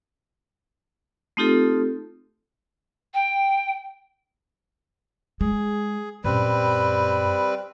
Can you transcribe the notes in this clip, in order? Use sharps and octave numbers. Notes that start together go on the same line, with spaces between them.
A3 C4 D#4 F4 G4 A4
G5
G#3 G#4
F#2 A#2 G3 C4 B4